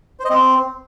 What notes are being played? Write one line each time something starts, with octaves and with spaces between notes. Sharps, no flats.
C5
D#5
C4